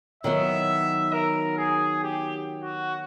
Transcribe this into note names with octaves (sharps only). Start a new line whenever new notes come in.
D#3 F#3 B3 E5
A#4
G#4
G4
F#4